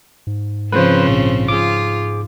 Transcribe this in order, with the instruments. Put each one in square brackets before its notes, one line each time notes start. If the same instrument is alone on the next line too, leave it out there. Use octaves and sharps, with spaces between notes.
[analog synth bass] G#2
[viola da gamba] C#3 F3 C4 [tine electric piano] B4 C5
[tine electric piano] A#1
[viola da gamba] F4 [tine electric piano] G#4 D6